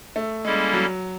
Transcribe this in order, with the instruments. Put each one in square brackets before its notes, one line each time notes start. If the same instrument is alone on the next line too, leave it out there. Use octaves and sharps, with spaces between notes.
[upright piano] A3
[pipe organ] G3 A#3 C#4 E4 A4 [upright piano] G#3
[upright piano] F#3